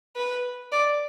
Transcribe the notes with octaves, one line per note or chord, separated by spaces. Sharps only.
B4
D5